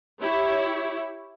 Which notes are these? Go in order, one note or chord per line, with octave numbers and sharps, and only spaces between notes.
E4 G4 C#5